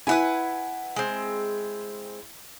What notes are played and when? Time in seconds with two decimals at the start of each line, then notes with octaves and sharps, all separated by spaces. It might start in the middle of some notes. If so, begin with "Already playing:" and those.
0.07 E4 B4 F#5 G#5
0.96 G#3 C4